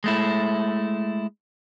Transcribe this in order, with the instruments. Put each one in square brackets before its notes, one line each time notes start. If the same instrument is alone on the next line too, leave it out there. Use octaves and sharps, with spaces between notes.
[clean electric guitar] G#3 A3 E4